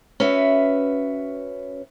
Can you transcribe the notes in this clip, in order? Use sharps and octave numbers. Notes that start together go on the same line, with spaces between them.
C#4 F#4 B4 E5